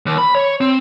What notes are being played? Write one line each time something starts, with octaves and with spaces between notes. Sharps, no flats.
D#2
B5
C#5
C4